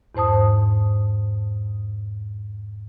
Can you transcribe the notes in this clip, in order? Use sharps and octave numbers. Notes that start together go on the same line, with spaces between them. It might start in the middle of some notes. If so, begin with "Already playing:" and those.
E2 G#2 C5 A5 D#6